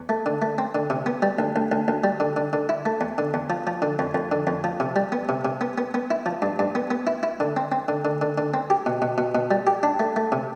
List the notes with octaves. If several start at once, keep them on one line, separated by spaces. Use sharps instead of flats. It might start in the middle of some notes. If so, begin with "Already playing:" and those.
Already playing: E2
A3
D3
A3
C4
D3
C3
B3
G3
D2
D2
D2
D2
G3
D3
D3
D3
E4
A3
E2
D3
E2
F3
F3
D3
F2
F2
D3
F2
F3
C3
G3
B3
C3
C3
B3
B3
B3
E4
F3
G2
G2
B3
B3
E4
E4
D3
C4
C4
D3
D3
D3
D3
C4
G4
B2
B2
B2
B2
G3
G4
D4
A3
A3
C3